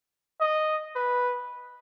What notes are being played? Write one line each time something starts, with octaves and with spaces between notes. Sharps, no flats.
D#5
B4